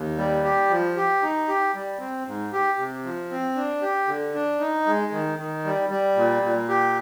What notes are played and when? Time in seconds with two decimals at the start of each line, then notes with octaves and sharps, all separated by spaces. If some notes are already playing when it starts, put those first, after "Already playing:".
Already playing: D#2
0.18 G3
0.44 G4
0.70 F3
0.96 G4
1.22 D#4
1.48 G4
1.74 G3
2.00 C4
2.27 G#2
2.52 G4
2.78 C3
3.05 F3
3.31 C4
3.56 D4
3.82 G4
4.08 D3
4.34 D4
4.60 D#4
4.86 G#3
5.12 D#3
5.39 D#3
5.65 G3
5.90 G3
6.16 A#2
6.43 A#2
6.69 G4